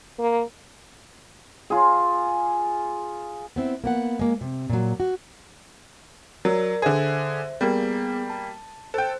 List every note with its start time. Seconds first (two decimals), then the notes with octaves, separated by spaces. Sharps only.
0.19 A#3
1.70 F4 G#4
3.56 B3 C4 E4
3.84 A#3 B3 F#5
4.19 G#3 A#3
4.41 C3
4.70 A#2 F#3
5.00 F#4
6.45 F#3 A#4 D5
6.82 D3 G#4 C5 E5
7.61 G3 A#3 B3 G#4
8.30 A5
8.94 A4 C5 G5